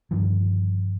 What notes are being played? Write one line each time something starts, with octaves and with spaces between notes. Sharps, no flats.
G2 D3 D#3 F3